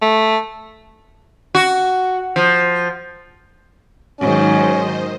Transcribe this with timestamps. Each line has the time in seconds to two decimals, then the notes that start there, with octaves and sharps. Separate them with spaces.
0.02 A3
1.55 F#4
2.36 F3
4.20 G#2 D#3 F#3 C#4 C5 D#5